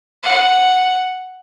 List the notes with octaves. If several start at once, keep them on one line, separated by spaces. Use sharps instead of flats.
F#5